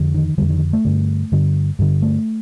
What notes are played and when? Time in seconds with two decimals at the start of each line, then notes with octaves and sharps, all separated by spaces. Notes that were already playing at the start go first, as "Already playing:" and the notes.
Already playing: F2 D3
0.14 D#3
0.38 F2 D3 G3
0.50 D#3
0.73 A3
0.85 G2 D3
1.32 G2 D3
1.79 G2 D3
2.02 A3